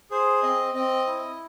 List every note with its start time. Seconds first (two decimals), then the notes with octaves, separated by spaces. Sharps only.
0.11 G#4 C5
0.43 C4 D#5
0.74 C4 D#5
1.07 E4